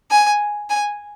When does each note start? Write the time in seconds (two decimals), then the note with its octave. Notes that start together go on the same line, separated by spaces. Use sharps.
0.11 G#5
0.70 G#5